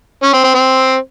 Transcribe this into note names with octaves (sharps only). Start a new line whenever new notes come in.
C#4
C4
C4
C4